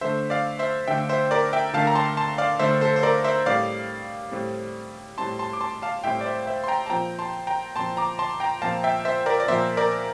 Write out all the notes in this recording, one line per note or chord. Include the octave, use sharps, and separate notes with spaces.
D3 A3 D4 C5 E5
D5 F5
C5 E5
D3 A3 D4 E5 G5
C5 E5
A#4 D5
E5 G5
D3 A3 D4 F5 A5
A#5
A5 C6
A5 C6
D5 F5
D3 A3 D4 C5 E5
A4 C5
C5
A#4 D5
C5 E5
A2 G3 C4 D5 F5
A2 G3 C4
A2 G3 C4 A5 C6
A5 C6
D6
A5 C6
F5 A5
A2 G3 C4 E5 G5
D5
C5 E5
C5 E5
C6
G5 A#5
A5
A#2 F3 C4 G5 A#5
A5 C6
G5 A#5
A#2 F3 C4 A5 C6
A#5 D6
A5 C6
G5 A#5
A#2 F3 C4 F5 A5
E5 G5
C5 E5
A#4 D5
D5
A#2 F3 C4 C5 E5
A#4 D5